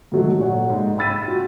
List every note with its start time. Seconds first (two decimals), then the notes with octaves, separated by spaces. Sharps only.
0.12 G#2 D#3 F#3 A3
0.39 A#2 C#5 F#5
0.70 G#2
0.98 G5 B5 E6 A6 B6 D#7
1.28 F4 F#4